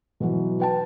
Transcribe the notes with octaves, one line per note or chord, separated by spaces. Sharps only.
B2 E3 F#3
B4 G5 A5